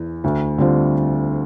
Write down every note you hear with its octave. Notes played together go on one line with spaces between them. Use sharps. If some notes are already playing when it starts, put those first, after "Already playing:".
Already playing: E2
D2
D3 G3 C4 F4